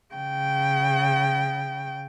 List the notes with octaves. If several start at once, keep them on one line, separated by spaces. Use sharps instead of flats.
C#3 G5